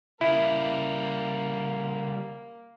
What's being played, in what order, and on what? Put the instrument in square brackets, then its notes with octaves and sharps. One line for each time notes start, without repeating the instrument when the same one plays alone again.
[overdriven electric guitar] C#3 G3 [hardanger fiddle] A#3 [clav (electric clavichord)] E4